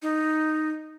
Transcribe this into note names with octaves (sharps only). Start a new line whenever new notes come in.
D#4